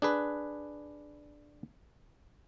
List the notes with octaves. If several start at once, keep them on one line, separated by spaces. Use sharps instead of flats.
D4 G#4 B4